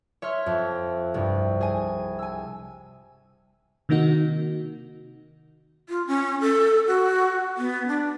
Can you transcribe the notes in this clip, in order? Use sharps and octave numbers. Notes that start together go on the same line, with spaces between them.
C#5 E5 C6 F6
F2
C2 G2
G#4 G#5
G#5 E6
C3 D#3 A#3 D#4 F#4
F4
C#4
A4
F#4
B3
D4